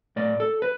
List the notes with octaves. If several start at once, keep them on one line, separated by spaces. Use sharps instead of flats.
A2 D5
A4
B4